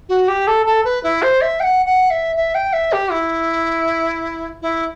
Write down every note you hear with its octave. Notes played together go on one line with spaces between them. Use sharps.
F#4
G4
A4
A4
B4
E4
C5
E5
G5
F#5
F#5
E5
E5
G5
E5
G4
E4
E4